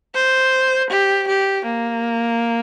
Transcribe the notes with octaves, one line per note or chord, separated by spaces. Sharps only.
C5
G4
G4
A#3